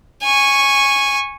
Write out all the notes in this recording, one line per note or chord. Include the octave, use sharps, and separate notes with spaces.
G#5 C#6